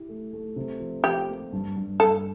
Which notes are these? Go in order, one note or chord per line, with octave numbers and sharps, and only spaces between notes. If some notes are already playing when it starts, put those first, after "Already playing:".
Already playing: E4 G4
A3
A3
C3
F3
F3 G4
A#3
G2
G2
G2 A4